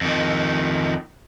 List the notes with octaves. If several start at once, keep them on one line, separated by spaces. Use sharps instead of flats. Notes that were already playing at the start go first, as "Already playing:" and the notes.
F2 D#3